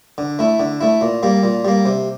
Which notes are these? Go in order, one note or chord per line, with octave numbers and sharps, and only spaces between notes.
D3
A3 E4
D3
A3 E4
A#2
G3 A#3
A#2
G3 A#3
C3